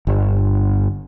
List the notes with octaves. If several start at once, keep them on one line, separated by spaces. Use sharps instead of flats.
G1